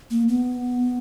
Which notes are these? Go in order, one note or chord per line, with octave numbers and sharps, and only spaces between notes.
A#3
B3